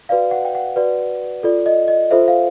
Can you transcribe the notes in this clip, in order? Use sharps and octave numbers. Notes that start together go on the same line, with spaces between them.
F#4 B4 D5 F5
F#5
G5
F#5
F#4 B4 D5
F4 A4 D5
D#5
D#5
F4 A4 C5 E5
F5